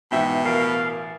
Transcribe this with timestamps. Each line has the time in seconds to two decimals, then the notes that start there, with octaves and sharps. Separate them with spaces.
0.12 G#2 B2 E3 E5 F#5 G5
0.45 A1 A#4 F5 D7